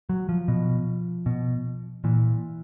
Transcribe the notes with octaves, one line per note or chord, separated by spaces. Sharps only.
F#3
F3
B2
B2
A#2 E3